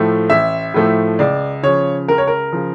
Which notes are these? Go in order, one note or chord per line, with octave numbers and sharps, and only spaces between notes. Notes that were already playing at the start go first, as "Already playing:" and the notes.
Already playing: A2 F3 A3
A1 E5
A2 F3 A3
C#2 D5
C#3 F3 C#5
C#2 A#4
C#5
A#4
C#3 F3